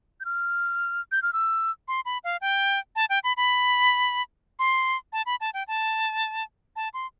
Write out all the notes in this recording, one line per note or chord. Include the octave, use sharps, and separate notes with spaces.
G6
F6
G6
F6
E6
C6
B5
F5
G5
A5
G5
B5
B5
C6
A5
B5
A5
G5
A5
A5
C6